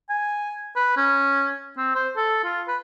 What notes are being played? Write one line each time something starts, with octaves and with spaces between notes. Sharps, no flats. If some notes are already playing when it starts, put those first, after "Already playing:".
G#5
B4
C#4
C4
C5
A4
F4
B4